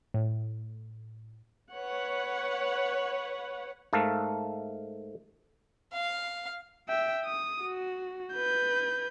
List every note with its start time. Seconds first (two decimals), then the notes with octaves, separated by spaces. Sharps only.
0.14 A2
1.73 B4 C#5 F#5
3.93 G#2 A3 A4 A#4 F5
5.94 F5
6.89 E5 G5
7.25 D#6
7.62 F#4
8.34 B4 G6